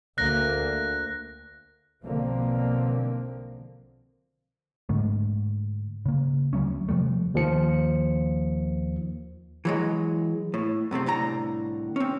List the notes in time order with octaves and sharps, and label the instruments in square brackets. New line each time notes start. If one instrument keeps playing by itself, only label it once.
[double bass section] D2 A#3 [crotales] F#6 A#6
[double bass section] B1 B2 D3 F3 A#3 C4
[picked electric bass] G#2 D3 A3
C#3 A#3
D2 F#3 A3 C#4
C3 F3 G3 A3
[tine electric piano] D#2 D#3 F3 C#7
[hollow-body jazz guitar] E3 F#3 G#3
A2
F#2 C3 A3 C4
C2 A2 D3 A#5
C4 C#4